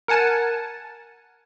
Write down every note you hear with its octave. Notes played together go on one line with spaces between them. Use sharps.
A#4 F#5 G#5 A5